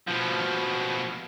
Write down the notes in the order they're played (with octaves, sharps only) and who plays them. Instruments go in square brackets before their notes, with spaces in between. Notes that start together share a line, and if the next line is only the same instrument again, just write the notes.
[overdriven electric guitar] B2 F3